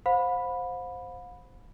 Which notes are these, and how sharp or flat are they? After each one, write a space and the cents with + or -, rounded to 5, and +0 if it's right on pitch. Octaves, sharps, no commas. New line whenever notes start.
C5 +0 F5 +45 B5 +0